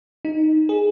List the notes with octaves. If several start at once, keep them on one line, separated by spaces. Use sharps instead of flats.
D#4
G#4